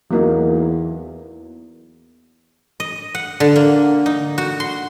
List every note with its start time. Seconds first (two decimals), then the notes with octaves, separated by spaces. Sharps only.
0.11 E2 F#3 A#3 D#4
2.80 D#5
3.15 F#5
3.40 D3
3.56 A#3
4.06 D#4
4.38 F#4
4.60 C6